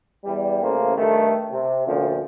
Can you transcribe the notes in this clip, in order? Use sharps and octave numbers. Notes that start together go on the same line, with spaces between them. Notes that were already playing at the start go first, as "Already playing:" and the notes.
E2 G3
A1 C#3 A3 A#3 C5
G2 D#3 A3
C3
D2 A#2 D3 F3 C#4